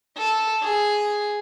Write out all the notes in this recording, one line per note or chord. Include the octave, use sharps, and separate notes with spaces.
A4
G#4